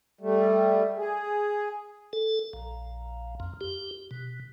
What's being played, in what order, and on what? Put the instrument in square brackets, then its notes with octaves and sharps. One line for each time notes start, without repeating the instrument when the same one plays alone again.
[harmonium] G3 A3
G#4
[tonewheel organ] A4
A#1
F2
G4
B2